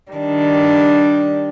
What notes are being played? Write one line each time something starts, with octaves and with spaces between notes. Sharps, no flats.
D#3 G3 D4